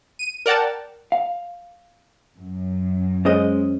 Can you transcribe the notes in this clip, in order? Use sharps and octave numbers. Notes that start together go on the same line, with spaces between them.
D#7
A#4 D5 F#5 G5 A5
F5
F#2
G#3 C#4 C5 D#5